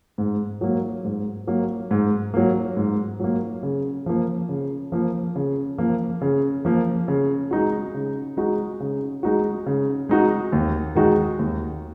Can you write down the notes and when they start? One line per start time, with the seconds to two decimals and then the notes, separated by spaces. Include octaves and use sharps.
0.18 G#2
0.61 F#3 A#3
1.04 G#2
1.47 F#3 A#3
1.91 G#2
2.34 F#3 A#3
2.77 G#2
3.20 F#3 A#3
3.63 C#3
4.06 F3 A#3
4.49 C#3
4.92 F3 A#3
5.36 C#3
5.78 F3 A#3
6.21 C#3
6.65 F3 A#3
7.08 C#3
7.51 G#3 D#4 F#4
7.94 C#3
8.37 G#3 D#4 F#4
8.80 C#3
9.23 G#3 D#4 F#4
9.66 C#3
10.09 G#3 D#4 F#4
10.52 D#2
10.95 D#3 G#3 D#4 F#4
11.39 D#2